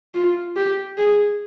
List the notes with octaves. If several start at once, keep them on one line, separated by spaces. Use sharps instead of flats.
F4
G4
G#4